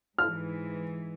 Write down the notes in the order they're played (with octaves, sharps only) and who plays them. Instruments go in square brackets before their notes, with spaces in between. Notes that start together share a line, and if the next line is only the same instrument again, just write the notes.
[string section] G#2 E3 [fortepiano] F6